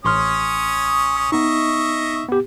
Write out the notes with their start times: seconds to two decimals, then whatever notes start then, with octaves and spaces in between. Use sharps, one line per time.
0.05 A1 C#4 C#5 C6 D#6 F6
1.32 B3 D#4 D#5 E5 C#6
2.29 B3 G4